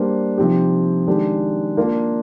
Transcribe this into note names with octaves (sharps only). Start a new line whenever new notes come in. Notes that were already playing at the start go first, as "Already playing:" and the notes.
Already playing: G3 A#3 D4 G#4 C5
C3 F3 C4 D#4 G4
D#3 G#3 D4 G4
A#3 D4 F4